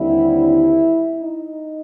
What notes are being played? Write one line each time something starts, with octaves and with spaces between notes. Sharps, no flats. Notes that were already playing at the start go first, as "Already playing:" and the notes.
Already playing: D#2 D3 G3 C4 E4
D#4